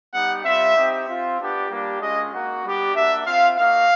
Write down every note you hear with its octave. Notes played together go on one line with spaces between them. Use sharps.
G3 B3 D#4 G4 F#5
G3 C4 F4 E5
C4 D#4 G4
C4 F4
B3 D4 G4
G3 A#3 D4 G4
G#3 C#4 F4 D#5
A#3 D#4 F#4
G3 B3 D4 G4
A#3 D4 F#4 E5
C4 F4 F5
A#3 D#4 F#4 F5